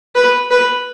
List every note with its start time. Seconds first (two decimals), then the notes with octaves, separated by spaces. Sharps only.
0.15 B4
0.51 B4